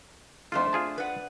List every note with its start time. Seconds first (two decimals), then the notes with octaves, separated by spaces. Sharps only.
0.52 F2 A3 D4 F4 C5
0.73 F4 G#4 A5
0.98 B4 D5 F#5